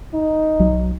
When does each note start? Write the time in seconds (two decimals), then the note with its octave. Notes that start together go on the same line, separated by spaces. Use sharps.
0.14 D#4
0.59 B1 F#3